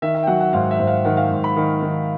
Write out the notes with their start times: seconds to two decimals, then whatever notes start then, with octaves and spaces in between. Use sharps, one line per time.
0.02 D#3 E5
0.15 E5
0.23 G5
0.27 F#3 F#5
0.41 F#5
0.53 G#2 F5
0.71 E5
0.79 G#2
0.87 F5
1.05 D#3 F#5
1.17 F5
1.30 G#2
1.44 B5
1.56 D#3
1.82 D#3